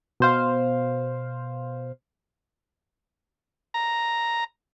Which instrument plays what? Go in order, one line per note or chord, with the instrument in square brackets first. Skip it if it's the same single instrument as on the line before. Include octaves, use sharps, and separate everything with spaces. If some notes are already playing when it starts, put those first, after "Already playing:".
[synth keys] B2 C5 F5
[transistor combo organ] A#5